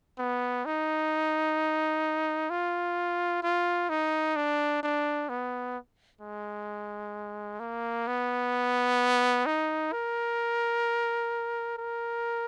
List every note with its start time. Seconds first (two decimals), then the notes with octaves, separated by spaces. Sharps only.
0.18 B3
0.65 D#4
2.50 F4
3.43 F4
3.90 D#4
4.36 D4
4.83 D4
5.29 B3
6.21 G#3
7.60 A#3
8.07 B3
9.46 D#4
9.92 A#4
11.77 A#4